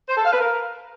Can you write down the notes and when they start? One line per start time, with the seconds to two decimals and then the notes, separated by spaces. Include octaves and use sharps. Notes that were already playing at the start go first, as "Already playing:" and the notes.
0.09 C5
0.17 A4
0.25 F5
0.33 B4
0.41 A#4